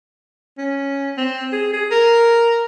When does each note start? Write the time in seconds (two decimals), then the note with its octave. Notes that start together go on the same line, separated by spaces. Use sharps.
0.58 C#4
1.18 C4
1.52 G#4
1.73 G#4
1.91 A#4